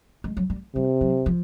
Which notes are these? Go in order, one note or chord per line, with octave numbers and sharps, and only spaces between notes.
G#3
F#3
G3
C3 G3
F#3
F3